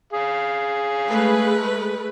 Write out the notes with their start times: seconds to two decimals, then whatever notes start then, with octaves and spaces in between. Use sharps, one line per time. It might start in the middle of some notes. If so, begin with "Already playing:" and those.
0.13 G#4 F5
1.07 G#3 A3 B4